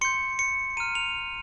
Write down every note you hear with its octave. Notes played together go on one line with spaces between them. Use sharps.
C6 G6 C#7
C#7
A#5 F6 D#7
F7